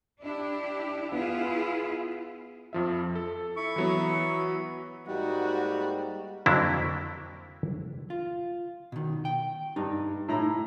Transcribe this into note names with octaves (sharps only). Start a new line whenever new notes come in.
D4 E4 G4
B3 E4 F4 G#4
F2 F3 E5
A4
E4 B5 C#6
E3 F#3 B3
G#2 G3 A#3 D#4 F#4
F2 D3 F#3 A#3 D4 E4
F4
B2 D#3
G5
G2 D#4
A2 E4 A#5